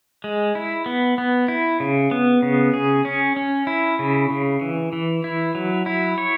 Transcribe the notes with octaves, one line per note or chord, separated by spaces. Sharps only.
G#3
E4
B3
B3
E4
C#3
B3
C#3
G#4
C#4
C#4
E4
C#3
C#3
E3
E3
E4
F#3
E4
C#5